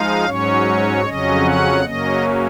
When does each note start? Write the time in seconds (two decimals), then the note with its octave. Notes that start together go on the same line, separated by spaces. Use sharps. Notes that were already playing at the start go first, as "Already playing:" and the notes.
Already playing: F3 G#3 D#4 F5
0.25 G#2 F#3 C#4 C#5
1.04 F2 C#3 F#3 C#4 D#5
1.44 F#5
1.84 F#2 C#3 F#3 A#3 C#4 D#5